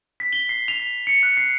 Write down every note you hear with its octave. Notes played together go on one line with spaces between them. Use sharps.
B6
G7
C7
F7
B6
C#7
F#6
C7